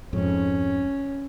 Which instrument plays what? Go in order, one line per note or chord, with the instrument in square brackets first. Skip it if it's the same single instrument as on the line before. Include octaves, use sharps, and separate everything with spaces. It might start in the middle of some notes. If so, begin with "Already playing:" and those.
[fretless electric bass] F2 G#2 [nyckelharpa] C#4